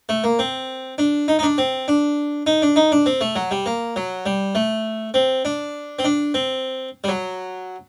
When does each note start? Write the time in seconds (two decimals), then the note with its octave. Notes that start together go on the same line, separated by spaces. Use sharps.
0.09 A3
0.24 A#3
0.39 C4
0.98 D4
1.28 D#4
1.39 D#4
1.43 D4
1.58 C4
1.88 D4
2.47 D#4
2.62 D4
2.76 D#4
2.92 D4
3.06 C4
3.21 A3
3.36 F#3
3.51 G3
3.66 A#3
3.96 F#3
4.26 G3
4.55 A3
5.14 C4
5.45 D4
5.99 C4
6.04 D4
6.34 C4
7.04 G3
7.08 F#3